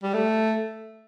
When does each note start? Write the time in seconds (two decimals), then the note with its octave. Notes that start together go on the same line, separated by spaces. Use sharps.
0.03 G3
0.14 A3